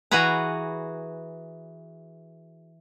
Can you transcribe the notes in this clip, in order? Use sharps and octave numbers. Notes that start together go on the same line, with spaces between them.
E3 F#4 G#4 B4 A#5